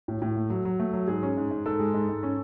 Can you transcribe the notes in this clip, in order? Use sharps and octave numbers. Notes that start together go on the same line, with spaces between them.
A2
A2
A3
F#3
F#3
A3
F#3
G#2 G#4
C#4
G#2
G#2
G#2 A4
G#3
G#2
G#2
C#4